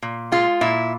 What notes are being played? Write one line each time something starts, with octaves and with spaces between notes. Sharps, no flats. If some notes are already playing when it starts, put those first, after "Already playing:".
A#2
G#3 F4
A#2 E4